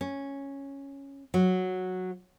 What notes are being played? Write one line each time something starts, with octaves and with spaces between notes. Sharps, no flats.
C#4
F#3